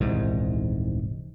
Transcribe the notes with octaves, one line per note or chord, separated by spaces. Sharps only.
D#1 C2 G#2 E3